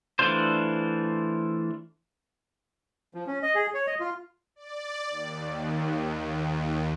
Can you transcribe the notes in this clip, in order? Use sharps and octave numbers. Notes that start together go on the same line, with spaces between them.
E3 A3 D4 F4 C5
F3
C#4
D#5
G#4
C#5
D#5
F4
D5
D#2